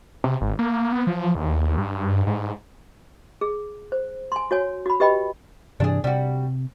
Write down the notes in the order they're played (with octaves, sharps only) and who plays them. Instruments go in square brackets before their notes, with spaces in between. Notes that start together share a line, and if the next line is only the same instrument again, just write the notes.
[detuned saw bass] C3
G#1
A#3
B3
F3
D#2
G2
G#2
[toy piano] G#4
C5
G#5 C6
F#4 C#5 G#5
F#4 B5
G4 B4 D#5 G5 B5
[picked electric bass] G2 C3 E3 [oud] D4 G#4
[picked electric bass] C3 [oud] G3 F#4